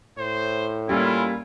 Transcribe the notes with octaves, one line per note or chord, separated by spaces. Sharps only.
A2 C5
G3 A#3 C#4 E4 F4